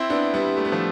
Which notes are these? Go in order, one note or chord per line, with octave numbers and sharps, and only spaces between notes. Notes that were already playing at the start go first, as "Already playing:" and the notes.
Already playing: C4 E4
B3 D4
G3 B3
A3
B3
F3 A3